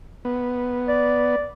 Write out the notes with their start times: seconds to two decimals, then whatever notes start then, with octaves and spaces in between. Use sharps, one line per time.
0.25 B3
0.88 D5